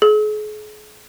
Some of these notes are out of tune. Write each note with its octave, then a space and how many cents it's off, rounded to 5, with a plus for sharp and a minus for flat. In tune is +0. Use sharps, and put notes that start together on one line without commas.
G#4 +40